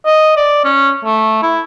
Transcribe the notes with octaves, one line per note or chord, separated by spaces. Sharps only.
D#5
D5
C#4
A3
E4